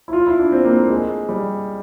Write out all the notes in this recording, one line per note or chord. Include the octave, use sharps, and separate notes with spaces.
E4
F4
E4
D4
C4
A#3
A3
G#3
G3